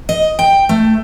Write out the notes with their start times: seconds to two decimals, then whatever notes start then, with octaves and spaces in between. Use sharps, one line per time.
0.09 D#5
0.39 G5
0.69 A3